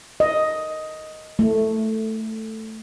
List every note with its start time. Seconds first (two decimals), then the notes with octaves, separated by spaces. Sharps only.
0.20 D#5
1.39 A3